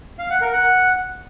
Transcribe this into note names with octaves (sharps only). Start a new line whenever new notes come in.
F5
F#5
A#4
F#5